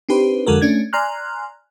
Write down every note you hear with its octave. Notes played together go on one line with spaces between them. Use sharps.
C4 D4 D#4 G4 B4 C5
F2 D3 G#3 F#4 A4 A#4
A3 C#4 D4 G#6
D5 G#5 A#5 C6 F6 F#6